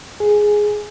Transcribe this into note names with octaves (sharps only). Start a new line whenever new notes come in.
G#4